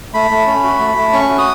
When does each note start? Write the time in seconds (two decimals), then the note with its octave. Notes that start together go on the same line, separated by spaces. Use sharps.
0.14 A3 B5
0.31 A3
0.47 C#4
0.63 F#4
0.79 A3
0.97 A3
1.13 C#4 C#6
1.29 F#4
1.38 D#6